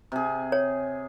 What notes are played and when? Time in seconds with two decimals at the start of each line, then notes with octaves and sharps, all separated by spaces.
0.12 C3 G#4
0.52 C#5